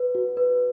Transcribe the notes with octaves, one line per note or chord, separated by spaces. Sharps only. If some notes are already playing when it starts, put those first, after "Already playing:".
Already playing: B4
F#4
B4